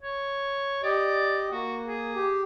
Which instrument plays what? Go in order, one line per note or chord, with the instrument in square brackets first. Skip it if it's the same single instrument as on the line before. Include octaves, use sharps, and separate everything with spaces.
[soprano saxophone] C#5
[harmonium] G4 D#5 [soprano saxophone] D5
[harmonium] A#3 [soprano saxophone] F#4
[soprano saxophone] G#4
[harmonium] G4